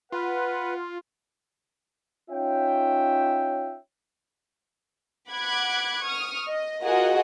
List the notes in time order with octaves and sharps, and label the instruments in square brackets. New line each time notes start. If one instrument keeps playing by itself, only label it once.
[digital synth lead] F4 [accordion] B4 [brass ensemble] F#5
[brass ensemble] C#4 D#4 F4 C#5 E5 G5
[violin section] F#5 B5 D6 F#6 G#6
C#6 D#6 F6
D#5
F4 F#4 G#4 A#4 D#5 F#5